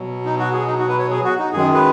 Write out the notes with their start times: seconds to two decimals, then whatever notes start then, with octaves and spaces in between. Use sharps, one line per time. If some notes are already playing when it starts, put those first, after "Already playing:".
Already playing: B2 F#3
0.25 D#4
0.39 F#4
0.53 G#4
0.67 D#4
0.79 F#4
0.89 B4
0.99 C#5
1.11 G#4
1.24 F#4
1.39 D#4
1.53 F#2 D#3 G#3 G#4
1.75 B4